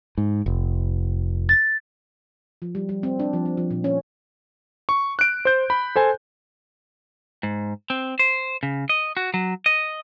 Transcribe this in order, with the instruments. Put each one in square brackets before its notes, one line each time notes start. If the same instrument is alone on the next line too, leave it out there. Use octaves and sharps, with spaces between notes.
[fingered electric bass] G#2
F1
[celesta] A6
[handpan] F3
G3
G3
C4
D4
F3
C4
F3
A#2
C#4
[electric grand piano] C#6
F#6 D7
C5 G6
B5
A4 C5 G#5
[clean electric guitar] G#2
C4
C5
C#3
D#5
F#4
F#3
D#5